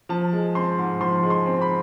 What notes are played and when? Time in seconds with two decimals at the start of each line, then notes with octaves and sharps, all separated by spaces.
0.09 F3 A5
0.33 G#3
0.55 C4 C6
0.78 G#2
1.01 F3 C6
1.23 G#3
1.30 C6
1.46 C4
1.61 B5